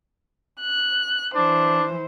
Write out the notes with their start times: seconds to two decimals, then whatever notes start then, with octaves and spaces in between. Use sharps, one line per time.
0.60 F#6
1.35 E3 D4 C5